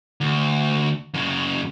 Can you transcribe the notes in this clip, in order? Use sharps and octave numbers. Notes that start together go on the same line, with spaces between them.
D2
F#2 C#3